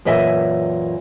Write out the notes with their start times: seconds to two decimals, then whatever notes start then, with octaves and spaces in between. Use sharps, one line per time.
0.05 F#2 A#2 E3 D#5 E5 G#5